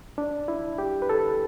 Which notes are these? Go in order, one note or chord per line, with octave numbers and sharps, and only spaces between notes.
D4
E4
G4
B4
A4